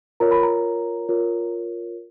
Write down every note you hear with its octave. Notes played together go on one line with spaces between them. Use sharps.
F4 A#4 C#5 A#5
B5
A#5
F4 A#4 C#5